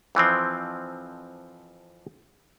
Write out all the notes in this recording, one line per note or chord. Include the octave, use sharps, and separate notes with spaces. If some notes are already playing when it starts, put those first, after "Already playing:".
F2 E3 F3 C4